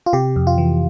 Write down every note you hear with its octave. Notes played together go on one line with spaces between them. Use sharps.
F4
C3 G4
F2
F4
E3